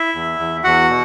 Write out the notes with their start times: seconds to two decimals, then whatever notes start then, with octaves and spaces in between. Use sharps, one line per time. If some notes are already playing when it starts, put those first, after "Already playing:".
Already playing: E4 E5
0.15 E2
0.39 E2
0.64 E2 F#4 F#5
0.89 B2